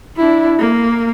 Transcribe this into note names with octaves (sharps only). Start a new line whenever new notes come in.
D4 E4
A#3